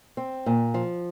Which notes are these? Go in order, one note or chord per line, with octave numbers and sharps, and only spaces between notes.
C4
A#2
F3